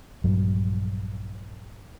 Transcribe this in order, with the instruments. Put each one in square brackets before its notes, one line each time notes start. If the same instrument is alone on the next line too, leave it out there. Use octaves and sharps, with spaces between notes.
[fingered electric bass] A#1 G2 F#3